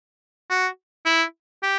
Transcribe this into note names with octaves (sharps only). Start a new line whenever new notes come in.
F#4
E4
G4